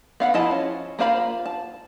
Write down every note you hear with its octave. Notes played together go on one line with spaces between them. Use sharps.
B3 F5 F#5
F3 E4 G#4 D#5 A5
C#4
A#3 F4 C5 F5 B5
A5